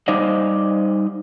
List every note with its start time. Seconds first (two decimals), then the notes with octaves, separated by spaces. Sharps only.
0.08 G3 D#4 C5 D5 D#5 F5